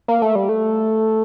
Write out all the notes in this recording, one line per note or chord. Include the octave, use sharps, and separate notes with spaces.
A#3
A3
G3
A3